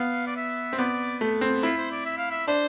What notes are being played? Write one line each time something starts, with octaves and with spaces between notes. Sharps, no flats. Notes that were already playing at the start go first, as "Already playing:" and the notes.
Already playing: B3 F5
D5
E5
C4
B3 D5
A3
C4
E4 F4
C5
D5
E5
F5
E5
D4 C5